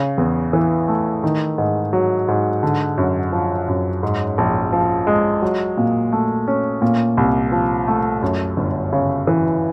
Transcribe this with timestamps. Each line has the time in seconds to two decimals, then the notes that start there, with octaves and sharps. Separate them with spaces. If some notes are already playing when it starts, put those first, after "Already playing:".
Already playing: C#3
0.18 E2
0.53 E3
0.88 A3
1.24 D#3
1.58 G#2
1.93 F#3
2.28 G#2
2.63 D3
2.98 F#2
3.32 F3
3.68 F#2
4.03 G#2
4.38 A#1
4.73 F3
5.07 G#3
5.42 F#3
5.77 A#2
6.13 A3
6.48 C#4
6.82 A#2
7.17 C2
7.52 F3
7.88 A3
8.22 F#2
8.57 G1
8.93 C#3
9.27 E3